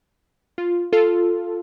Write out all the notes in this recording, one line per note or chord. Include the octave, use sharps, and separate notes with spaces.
F4
F4 A4